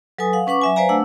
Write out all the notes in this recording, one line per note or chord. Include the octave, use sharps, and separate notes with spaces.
F#3 A4 B4 G#5 D#6
F5 F#5
C#4 B4 F#5 C#6 D6
F#3 E5 G#5
B4 C5 D5 F5 G#5 A#5
A3 D4 F#5 E6